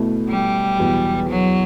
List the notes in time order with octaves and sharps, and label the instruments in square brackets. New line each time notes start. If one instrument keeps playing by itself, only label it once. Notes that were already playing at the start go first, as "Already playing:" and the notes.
Already playing: [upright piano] B2 A3 E4
[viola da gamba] G3
[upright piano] E2 B2 F#3
[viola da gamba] F#3